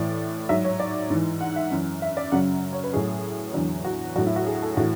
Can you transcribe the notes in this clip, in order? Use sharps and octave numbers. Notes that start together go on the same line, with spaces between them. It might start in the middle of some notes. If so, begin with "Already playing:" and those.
Already playing: A2 E3 D5
G#2 F#3 E5
C#5
D5
G#2 E3
F#5
E5
F#2 E3
E5
D5
F#2 C#3 F#3 F#5
C#5
B4
A2 F#3 G#4
E2 D3 F#3
F#4
A2 F#3 F#4
E4
F#4
G#4
A4
A2 E3 F#4